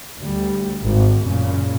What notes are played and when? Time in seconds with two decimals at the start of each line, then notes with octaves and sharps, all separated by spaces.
0.21 D2 G3
0.84 G#1
1.22 F#2 A#2 C#3